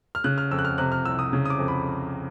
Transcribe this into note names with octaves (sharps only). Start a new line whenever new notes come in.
F6
C#3 F#6
F6
F2 E6
F#6
F6
C3 F#6
F6
C2 E6
D#6
C#3
D#6
D6
F2
B5